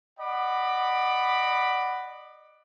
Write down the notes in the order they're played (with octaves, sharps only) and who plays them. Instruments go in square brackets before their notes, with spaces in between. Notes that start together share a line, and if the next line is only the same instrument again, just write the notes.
[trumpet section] D5 D#5 F#5 B5 D6